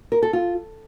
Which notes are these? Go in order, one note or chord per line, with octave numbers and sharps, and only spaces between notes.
A#4
A4
F4